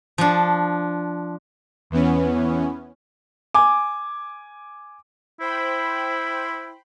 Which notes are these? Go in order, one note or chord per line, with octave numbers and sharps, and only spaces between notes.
F3 D4
E2 E3 B3 C#4
G#5 D6
E4 C5 G5 B5